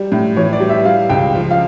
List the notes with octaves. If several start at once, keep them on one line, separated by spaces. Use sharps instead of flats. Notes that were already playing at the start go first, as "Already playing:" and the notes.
Already playing: G3
A2
E3 C#5
D5
G3
E5
G3 F5
C#2 G5
F3
F5